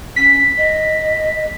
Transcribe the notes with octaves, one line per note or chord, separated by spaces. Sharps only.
C#4 B6
D#5